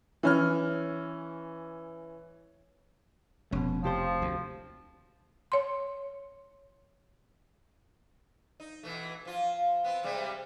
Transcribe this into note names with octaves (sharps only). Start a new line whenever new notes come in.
E3 C#4 F6
F1 B2 C#4
C3 F3 G4 C5
D2
C#5 C6
D#4
B2 E3 A3
F3 F4
B3 C4
C3 G3 G#3